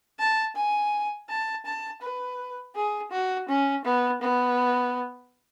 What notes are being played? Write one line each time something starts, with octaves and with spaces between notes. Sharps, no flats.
A5
G#5
A5
A5
B4
G#4
F#4
C#4
B3
B3